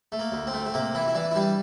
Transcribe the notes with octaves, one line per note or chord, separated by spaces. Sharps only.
A3
A#3
D2
C4
A3
A3
C3 A#3
E3 E4
E4
E3 D4
E4
G3 D4